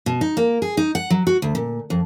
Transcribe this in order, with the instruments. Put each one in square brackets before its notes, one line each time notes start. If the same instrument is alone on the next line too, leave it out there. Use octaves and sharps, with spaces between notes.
[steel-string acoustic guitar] B2
D#4
A#3
G#4
D#4
F#5
F#3
F#4
D2
A#2
F2